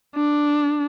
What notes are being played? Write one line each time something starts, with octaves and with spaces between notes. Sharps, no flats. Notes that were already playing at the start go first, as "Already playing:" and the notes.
D4